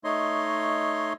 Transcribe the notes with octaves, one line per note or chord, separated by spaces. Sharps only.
A3 D#4 C#5 D#5 C6